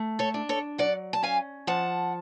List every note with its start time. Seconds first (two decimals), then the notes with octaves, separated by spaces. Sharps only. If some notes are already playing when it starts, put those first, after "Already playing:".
Already playing: A3
0.19 A4 C#5
0.34 D4
0.49 A4 C#5
0.78 F#3 D5 F#5
1.13 A5
1.23 C#4 F5 G#5
1.67 F3 F#5 A5